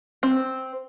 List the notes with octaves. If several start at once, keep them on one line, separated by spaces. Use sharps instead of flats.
C4